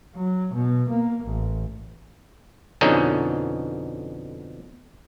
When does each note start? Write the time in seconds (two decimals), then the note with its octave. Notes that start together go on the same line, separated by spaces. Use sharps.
0.16 F#3
0.54 B2
0.89 A#3
1.24 A1
2.81 F2 B2 D3 C#4 D#4